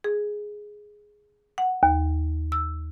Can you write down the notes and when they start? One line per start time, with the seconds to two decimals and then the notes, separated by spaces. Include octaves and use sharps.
0.04 G#4
1.58 F#5
1.83 D#2
2.52 E6